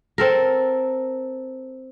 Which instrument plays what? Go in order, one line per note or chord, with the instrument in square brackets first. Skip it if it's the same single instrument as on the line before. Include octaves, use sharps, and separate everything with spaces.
[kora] C4 A4 A#4